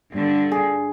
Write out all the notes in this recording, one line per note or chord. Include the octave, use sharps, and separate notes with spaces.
G2 D3
G#4